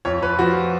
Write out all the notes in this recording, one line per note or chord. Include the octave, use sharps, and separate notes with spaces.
F2 C#5
F3 B4
F3 F#4